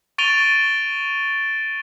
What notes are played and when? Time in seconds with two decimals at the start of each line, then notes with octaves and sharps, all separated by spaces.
0.18 C#6 A6 D7 D#7 F7 G7